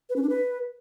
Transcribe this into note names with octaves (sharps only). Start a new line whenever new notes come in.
B4
C#4
D4
B4